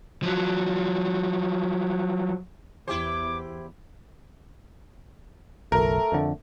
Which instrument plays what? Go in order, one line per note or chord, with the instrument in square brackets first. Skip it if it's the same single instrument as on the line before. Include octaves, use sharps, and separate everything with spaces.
[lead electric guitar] F3 F#3
[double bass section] E2 [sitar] E4 G4 C5 [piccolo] D6
[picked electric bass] F#1 B1 [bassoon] A3 [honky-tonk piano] A#4
[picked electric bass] F2 D3